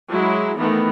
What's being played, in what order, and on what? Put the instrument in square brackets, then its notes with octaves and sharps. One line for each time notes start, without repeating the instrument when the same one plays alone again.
[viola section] F#3 G#3 E4
D#3 E3 A3 B3